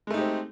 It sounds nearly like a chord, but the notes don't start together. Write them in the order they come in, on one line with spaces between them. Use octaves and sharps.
G#3 A3 D#4 G4 C4